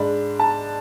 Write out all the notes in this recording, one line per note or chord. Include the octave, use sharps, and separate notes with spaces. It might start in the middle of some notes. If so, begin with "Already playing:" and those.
Already playing: G#2 G#3 D4 B5
A5